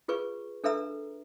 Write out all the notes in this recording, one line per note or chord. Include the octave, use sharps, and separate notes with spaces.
F4 G#4 B4 C#6
D4 A4 B4 E5 A#5 E6